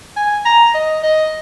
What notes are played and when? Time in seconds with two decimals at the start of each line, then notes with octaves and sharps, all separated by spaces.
0.17 G#5
0.45 A#5
0.74 D#5
1.03 D#5